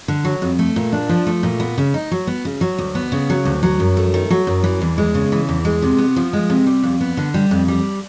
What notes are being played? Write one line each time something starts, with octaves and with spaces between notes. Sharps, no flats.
D3
F#3
F2
A3
A#2
D4
F3
A3
A#2
B3
C#3
D#4
F#3
B3
C#3
F#3
D2
B3
C#3
F#3
D2
F#3
F#2
A3
D#3
F#3
F#2
E3
E2
G#3
C#3
E3
E2
G#3
C3
B3
F3
G#3
C3
G3
F2
B3
D3
G3
F2
G3